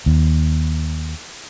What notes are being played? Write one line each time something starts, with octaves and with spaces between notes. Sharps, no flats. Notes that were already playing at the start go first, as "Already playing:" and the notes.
D#2